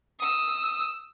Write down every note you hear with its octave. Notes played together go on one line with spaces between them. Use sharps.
D#6 E6